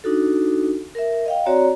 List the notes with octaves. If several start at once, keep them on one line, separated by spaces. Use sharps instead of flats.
D4 D#4 F#4 A4
A#4 E5
D#5 F5 G5
C4 F#4 C#5 D5 A#5